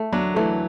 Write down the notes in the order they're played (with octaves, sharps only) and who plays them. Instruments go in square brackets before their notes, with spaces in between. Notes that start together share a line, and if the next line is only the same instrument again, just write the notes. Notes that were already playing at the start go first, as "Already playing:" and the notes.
Already playing: [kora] A3
[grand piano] F#3 [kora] D4
[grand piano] E3 [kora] A3